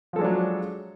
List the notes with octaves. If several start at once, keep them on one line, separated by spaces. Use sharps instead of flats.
F3 F#3 G#3 D4 A4